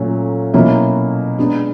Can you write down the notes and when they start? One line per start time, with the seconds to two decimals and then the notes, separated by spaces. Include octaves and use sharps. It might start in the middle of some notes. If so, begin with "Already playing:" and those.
Already playing: A#2 F#3 A3 C#4
0.54 B2 F#3 A#3 C#4 E4
1.38 G#3 B3 D4